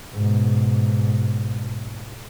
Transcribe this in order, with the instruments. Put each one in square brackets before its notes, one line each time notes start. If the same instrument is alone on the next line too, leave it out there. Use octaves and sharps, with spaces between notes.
[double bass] G#2 B2